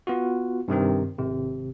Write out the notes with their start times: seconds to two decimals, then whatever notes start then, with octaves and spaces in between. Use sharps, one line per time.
0.07 B3 F4 F#4
0.68 G2 C3 D#3 C4
1.19 G#1 C3